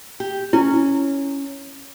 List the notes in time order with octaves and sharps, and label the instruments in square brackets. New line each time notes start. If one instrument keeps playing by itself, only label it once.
[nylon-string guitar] G4
[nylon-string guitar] C#4 [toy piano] E4